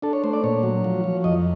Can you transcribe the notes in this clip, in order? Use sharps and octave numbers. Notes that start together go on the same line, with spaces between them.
D4 A4
C#5
A3 C5
D5
A#2 C#5
F#3
F3
F3
F2 D#5